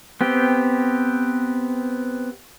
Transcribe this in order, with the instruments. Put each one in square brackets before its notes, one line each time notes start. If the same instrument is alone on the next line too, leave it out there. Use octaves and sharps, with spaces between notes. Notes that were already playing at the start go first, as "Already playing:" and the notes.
[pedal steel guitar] B3 C4 G4